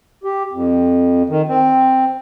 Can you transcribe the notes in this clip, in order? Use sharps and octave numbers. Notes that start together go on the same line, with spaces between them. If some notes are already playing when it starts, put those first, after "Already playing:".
G4
F2
D#3
C4